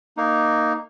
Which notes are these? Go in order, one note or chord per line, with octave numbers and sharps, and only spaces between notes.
A#3 D#4